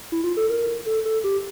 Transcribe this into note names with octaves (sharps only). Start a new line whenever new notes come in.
E4
F4
A4
A#4
A4
A4
G4